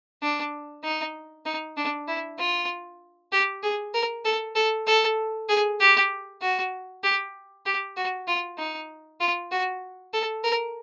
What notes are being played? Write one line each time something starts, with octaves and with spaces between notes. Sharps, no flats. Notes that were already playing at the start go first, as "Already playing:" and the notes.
D4
D#4
D#4
D4
E4
F4
G4
G#4
A#4
A4
A4
A4
G#4
G4
F#4
G4
G4
F#4
F4
D#4
F4
F#4
A4
A#4